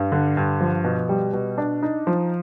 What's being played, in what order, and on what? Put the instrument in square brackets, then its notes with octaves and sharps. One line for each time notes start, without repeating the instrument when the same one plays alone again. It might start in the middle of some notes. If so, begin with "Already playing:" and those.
Already playing: [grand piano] G2
D3
G2
F3
B2
G3
B2
D4
D#4
F3